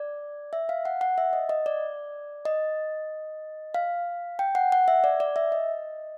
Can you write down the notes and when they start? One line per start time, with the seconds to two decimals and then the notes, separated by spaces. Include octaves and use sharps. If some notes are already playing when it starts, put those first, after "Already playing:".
Already playing: D5
0.53 E5
0.69 F5
0.85 F#5
1.01 F#5
1.18 E5
1.33 D#5
1.49 D#5
1.66 D5
2.45 D#5
3.74 F5
4.39 G5
4.55 F#5
4.72 F#5
4.88 E5
5.04 D5
5.20 D5
5.36 E5
5.52 D#5